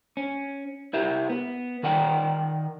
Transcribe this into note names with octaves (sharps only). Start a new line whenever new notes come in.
C#4
E4 G4 A#4 E5
B3
D#3 A#4 D5 F#5 G5